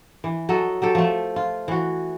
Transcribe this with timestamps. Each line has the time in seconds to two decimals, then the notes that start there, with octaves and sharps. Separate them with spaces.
0.24 E3
0.49 F#3 A4 D#5
0.82 F#3 G4 A4
0.95 F3 A3
1.36 F4
1.68 E3 F#4